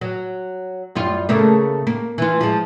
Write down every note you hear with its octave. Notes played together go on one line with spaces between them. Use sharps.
F#3
F#2 G3 F4
C#3 A3 A#3
A#3
E3 F4
F3 G#3